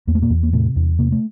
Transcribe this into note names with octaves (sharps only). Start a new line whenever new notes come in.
E2 A#3
A3
A#2 A#3
E2
A#3
A2 C3 A3
E2
C3 A#3
A3